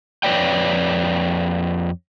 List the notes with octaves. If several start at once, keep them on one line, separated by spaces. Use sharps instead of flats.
F2 F#3 B4 C#5 D5 G5